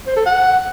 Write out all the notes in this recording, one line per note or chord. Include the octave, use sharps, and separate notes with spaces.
C5
A4
F#5